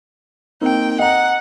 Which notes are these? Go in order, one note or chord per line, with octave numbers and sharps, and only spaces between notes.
A#3 C4 D#4 G5
D#5 F#5 A#5